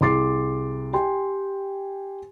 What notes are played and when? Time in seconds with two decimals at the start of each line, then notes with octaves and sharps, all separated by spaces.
0.01 C2 G#4 C6 D6 A6 C7
0.93 G4 G5 G#5 C6